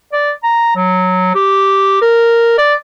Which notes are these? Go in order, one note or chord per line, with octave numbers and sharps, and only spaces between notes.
D5
A#5
F#3
G4
A#4
D5